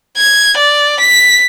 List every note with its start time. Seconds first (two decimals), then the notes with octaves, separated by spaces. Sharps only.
0.17 G#6
0.57 D5
1.00 B6